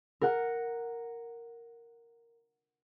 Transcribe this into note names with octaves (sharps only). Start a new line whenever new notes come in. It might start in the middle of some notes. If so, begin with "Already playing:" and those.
A#4 F#5